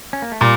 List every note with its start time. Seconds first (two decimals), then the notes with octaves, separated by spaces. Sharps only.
0.13 C#4
0.22 A#3
0.32 A3
0.41 A#2 G3